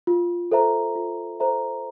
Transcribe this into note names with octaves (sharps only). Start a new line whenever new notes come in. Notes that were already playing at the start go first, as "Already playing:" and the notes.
F4
A4 C5 E5 A#5
F4
A4 C5 E5 A#5